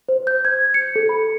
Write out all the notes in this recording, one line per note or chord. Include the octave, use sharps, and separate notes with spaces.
C5
G6
G#6
C#7
A4
B5